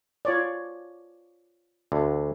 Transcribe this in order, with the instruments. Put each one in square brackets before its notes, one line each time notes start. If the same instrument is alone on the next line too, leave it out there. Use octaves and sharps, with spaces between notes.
[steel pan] F4 C#5 D5
[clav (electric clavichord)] D2 D3